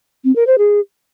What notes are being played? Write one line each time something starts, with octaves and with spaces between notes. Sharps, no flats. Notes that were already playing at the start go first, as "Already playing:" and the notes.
C4
A#4
C5
G#4